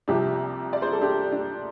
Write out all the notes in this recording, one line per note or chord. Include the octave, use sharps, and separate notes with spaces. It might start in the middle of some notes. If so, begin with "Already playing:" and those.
C2 C3 F3 D4 G4
D5
C5
A4
D4 G4
D4